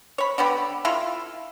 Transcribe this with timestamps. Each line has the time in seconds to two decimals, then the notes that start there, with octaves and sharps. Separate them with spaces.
0.18 C#5 B5
0.38 D3 B3 G4 B5
0.85 E4 F4 A4